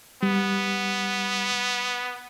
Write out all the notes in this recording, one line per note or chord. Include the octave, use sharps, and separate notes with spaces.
G3 B3